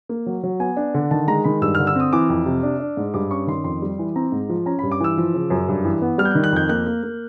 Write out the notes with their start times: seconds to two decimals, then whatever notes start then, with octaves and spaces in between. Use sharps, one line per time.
0.09 A#3
0.26 F#3
0.43 F#3
0.60 B3 G#5
0.77 D4
0.94 D3
1.11 D#3 A5
1.28 G#3 A#5
1.44 D#3 B5
1.62 G2 E6
1.75 F6
1.79 D3
1.87 E6
1.95 C4 D#6
2.13 E3 D6
2.30 F2
2.46 C3
2.63 D4
2.80 D4
2.97 G#2
3.14 G2 D6
3.31 C#4 C#6
3.47 D#3 C6
3.64 F2 C6
3.82 G3
3.99 E3
4.16 C4 A#5
4.32 G#2
4.49 F3
4.66 C#4 A#5
4.79 B5
4.83 G2
4.91 D6
5.00 E3 E6
5.18 F3
5.34 C#3
5.50 F#2
5.68 G2
5.85 E3
6.02 B3
6.18 G3 F6
6.25 G6
6.31 F#6
6.35 D#3
6.44 F#6
6.52 F2 G6
6.69 A#3 F#6
6.86 A#3
7.03 A#3